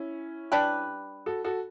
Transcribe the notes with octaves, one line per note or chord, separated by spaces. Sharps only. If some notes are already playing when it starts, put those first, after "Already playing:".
Already playing: C#4 E4
G3 D4 G4 B4
F#4 A4
F#4 A4